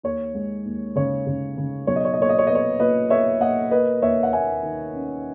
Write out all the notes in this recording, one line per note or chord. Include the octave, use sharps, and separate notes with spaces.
D#2 C#5
G#3
D#2
C#3 C#5
C#3
C#3
B1 C#5
D#5
C#5
D#5
A#2 C#5
D#5
C#5
B3 D#5
C#5
A#2 B4 D#5
B3 C#5 E5
A#2 D#5 F#5
A#3 B4 D#5
D#2 C#5 E5
F#5
A#3 E5 G#5
D#3
C#4